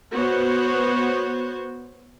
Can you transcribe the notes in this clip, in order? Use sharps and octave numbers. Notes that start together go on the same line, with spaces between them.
B3 F#4 C5 C#5